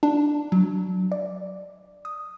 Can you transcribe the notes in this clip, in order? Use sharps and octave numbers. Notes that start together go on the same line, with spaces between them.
D4
F#3
D5
D#6